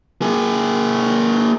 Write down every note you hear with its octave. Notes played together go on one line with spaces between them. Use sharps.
A#3 G#4